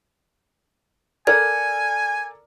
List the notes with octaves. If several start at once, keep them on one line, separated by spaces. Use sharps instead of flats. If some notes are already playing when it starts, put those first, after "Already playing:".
A4 A#4 D5 G#5 G#6